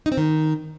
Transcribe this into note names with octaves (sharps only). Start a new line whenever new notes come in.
D#4
C4
D#3